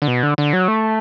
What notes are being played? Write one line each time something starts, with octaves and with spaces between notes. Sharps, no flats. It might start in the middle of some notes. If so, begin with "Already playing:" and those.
D3
B2
D3
D3
F#3
A3